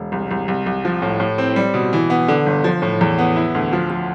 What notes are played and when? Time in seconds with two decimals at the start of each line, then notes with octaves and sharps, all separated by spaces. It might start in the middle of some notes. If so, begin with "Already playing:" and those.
Already playing: E1
0.12 C2
0.31 C2
0.48 C2
0.66 C2
0.85 F3
1.02 A2
1.20 A2
1.38 C4
1.56 G3
1.74 B2
1.93 E3
2.10 B3
2.28 D3
2.46 G1
2.64 F3
2.82 A2
3.01 E2
3.18 B3
3.36 E4
3.55 D2
3.73 F3
3.90 F3